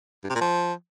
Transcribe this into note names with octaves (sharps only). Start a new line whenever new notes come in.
G2
C3
A#2
F3